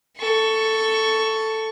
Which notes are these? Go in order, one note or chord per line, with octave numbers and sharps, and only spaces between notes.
A4 C#6